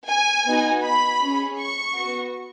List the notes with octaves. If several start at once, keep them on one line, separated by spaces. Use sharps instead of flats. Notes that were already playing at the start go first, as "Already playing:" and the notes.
G#5
B3 D#4 F#4
B5
C#4 G#4
C#6
B3 F#4